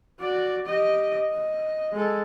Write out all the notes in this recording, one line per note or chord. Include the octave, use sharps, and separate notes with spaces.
F#4 D5
G4 D#5
D#5
G#3 A4